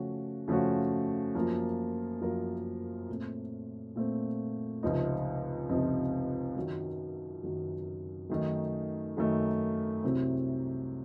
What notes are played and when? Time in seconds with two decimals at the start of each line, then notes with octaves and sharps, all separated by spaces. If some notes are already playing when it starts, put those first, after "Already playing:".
Already playing: C#3 F3 A3 C#4 F#4
0.48 C#3 F3 A3 C#4 F#4
1.35 F#2 F3 A#3 F4 A#4
2.21 F#2 F3 A#3 F4 A#4
3.09 A#2 A3 C4
3.96 A#2 A3 C4
4.83 C#2 C3 F3 C4 D#4
5.69 C#2 C3 F3 C4 D#4
6.56 F#2 D#3 F#3
7.43 F#2 D#3 F#3
8.29 F#2 D#3 A3 D#4
9.17 F#2 D#3 A3 D#4
10.03 C2 C3 F#3 C4